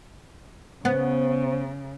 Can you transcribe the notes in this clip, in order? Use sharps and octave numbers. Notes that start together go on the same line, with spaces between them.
C#3 B3 C5